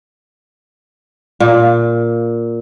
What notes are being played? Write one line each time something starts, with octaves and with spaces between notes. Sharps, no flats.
A#2